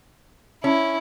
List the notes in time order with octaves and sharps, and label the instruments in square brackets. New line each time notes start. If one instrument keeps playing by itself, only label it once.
[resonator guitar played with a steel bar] C#4 [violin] E4